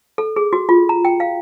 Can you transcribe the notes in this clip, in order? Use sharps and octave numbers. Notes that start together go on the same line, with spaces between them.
A4
G#4
F#4
F4
A#5
G5
F5